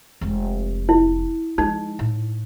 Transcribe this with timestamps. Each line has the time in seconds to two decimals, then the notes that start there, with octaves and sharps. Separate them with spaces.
0.21 F1 G#3
0.89 E4
1.58 F3 G#3 D#4
1.99 A2